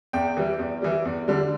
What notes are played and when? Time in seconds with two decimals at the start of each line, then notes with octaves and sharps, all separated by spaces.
0.13 E2 G5
0.37 E3 G3
0.59 E2
0.82 E3 G3
1.05 E2
1.28 D3 G3